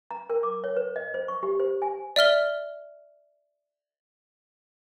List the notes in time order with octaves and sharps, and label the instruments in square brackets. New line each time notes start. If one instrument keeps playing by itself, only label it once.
[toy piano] A#5
A#4
D6
C#5
B4
D#5
C5
C#6
G4
C5
G#5
[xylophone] D5 E5 F6 G7